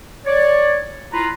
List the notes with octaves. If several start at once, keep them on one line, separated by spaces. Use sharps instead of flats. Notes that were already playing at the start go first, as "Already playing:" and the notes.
C#5 D5
E4 F4 B4 A#5